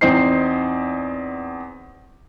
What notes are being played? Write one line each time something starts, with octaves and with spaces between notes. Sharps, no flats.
E2 C4 D#4 C5 C7